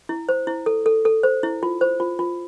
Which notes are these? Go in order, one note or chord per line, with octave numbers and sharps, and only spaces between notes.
E4
C5
E4
A4
A4
A4
C5
E4
F4
C5
F4
F4